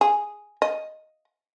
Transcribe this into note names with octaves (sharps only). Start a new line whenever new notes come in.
G#4
D#5